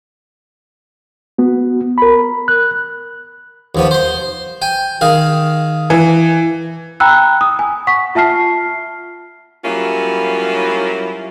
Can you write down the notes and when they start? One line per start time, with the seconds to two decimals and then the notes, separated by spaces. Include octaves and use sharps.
1.38 B3 F#4
1.98 A#4 B5
2.48 F#6
3.75 D#2 F3 B3
3.91 C5 C6
4.62 G5 G#5
5.01 D#3 G#4 F5
5.90 E3
7.00 G5 A#5 B5 E6 F#6
7.41 D#6
7.59 G#5
7.87 F#5 C#6 B6
8.15 F4 E5 A5 F6 C7
9.65 F#3 G3 A#3 C#4 E4 F4